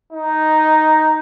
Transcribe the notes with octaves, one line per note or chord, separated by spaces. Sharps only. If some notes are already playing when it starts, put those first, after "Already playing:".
D#4